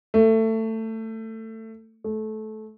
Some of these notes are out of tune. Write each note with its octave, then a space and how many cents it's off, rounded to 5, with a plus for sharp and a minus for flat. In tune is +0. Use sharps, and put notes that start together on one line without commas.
A3 +20
A3 -20